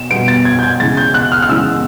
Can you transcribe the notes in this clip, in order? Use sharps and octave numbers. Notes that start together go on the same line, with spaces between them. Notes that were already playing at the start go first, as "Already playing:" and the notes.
Already playing: B2 E7
B2 G3 B3 D7
A6
G#6
G6
G#6
C#3 E3 G#3 A6
G6
F#6
F6
F6
C#3 E3 G#3 E6